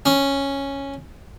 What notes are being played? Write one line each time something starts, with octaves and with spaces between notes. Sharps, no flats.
C#4